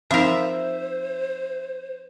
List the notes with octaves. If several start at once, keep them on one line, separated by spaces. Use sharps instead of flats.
F3 C4 D#4 A#4 C5 E5